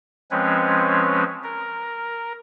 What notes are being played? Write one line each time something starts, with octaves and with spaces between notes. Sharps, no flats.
F3 G#3 C4 C#4 B4 C#5
A#4